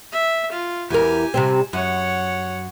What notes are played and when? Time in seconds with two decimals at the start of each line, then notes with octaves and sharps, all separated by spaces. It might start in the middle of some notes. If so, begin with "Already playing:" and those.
0.12 E5
0.52 F4
0.90 E2 G4 A#4 G#5
1.34 C3 G3 C4
1.73 F#2 C#5 F#5